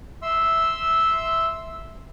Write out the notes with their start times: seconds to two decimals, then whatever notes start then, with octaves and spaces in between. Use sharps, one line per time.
0.22 E5 C6 E6